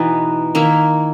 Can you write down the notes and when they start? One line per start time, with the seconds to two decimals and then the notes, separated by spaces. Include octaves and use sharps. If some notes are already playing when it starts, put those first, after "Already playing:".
Already playing: B2 E3 B3 D#4
0.55 D#3 A#3 E4